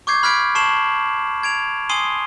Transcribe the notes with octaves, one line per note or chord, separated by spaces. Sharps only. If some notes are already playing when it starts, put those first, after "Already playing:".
C#6 D6 G6 G#6 C7
B5 F6 F#6 G#6 B6 D7
A5 C#6 C7 E7 F#7
G#6 D7 F7
G#5 C6 D#6 C7 D#7 G7